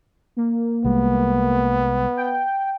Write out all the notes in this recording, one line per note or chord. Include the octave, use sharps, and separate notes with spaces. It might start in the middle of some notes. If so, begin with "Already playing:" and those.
A#3
C2 G3 G#3 B3
G5